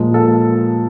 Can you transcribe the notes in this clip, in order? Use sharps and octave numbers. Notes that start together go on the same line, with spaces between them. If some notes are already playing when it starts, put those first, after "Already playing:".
Already playing: A#2 F3 G#3
A4